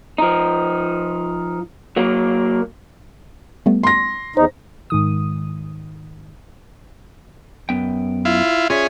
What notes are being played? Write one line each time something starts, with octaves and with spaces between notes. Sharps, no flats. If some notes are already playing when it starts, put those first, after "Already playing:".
F3 D#4
F#3 A#3
G3 A3 B3
C6 A#6
E2 D#4 C5
G#2 D#3 D#6
F#2 B3 G5
E4 F4
C#4 F4 G#4 D5 E5